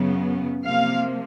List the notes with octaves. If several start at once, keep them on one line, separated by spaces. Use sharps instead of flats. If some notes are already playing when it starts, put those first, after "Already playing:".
Already playing: F#2 C#3 F#3 B3
C3 F3 A#3 F5